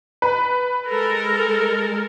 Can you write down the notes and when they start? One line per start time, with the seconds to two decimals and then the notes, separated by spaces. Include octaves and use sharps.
0.22 B4
0.89 G#3 A4 A#4